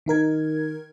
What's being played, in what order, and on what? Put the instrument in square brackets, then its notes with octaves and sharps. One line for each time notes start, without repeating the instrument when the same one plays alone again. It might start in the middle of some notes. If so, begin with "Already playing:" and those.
[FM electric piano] D#3 D#4 A#4 G#6